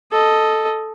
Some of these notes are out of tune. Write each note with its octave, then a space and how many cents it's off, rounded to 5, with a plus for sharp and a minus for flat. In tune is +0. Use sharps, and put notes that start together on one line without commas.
A4 +0 D#5 +0